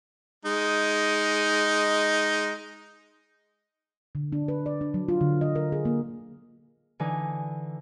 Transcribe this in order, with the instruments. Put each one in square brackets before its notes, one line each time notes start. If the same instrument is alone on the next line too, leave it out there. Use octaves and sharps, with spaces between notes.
[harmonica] G#3 D#4
[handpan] D3
D4
B4
D5
D4
F#3
F4
D3
D#5
A#4
G#4
A#3
[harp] D3 E3 D#4 G#5